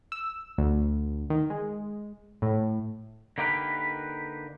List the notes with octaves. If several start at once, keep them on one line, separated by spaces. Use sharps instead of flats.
E6
D2
D#3
G#3
A2
D3 A#3 D#4 G4 A#4 B4